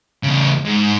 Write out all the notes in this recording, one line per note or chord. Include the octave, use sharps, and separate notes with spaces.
E2 C#3
G#2